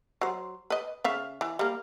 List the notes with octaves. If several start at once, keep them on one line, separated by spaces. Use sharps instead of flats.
F#3 C5
B4 D#5
C#3 E5 F5
E3
G3 A#3